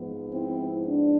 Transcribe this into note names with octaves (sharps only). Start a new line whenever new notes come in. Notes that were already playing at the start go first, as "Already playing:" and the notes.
Already playing: G#2 F3 B3
C4 E4
D4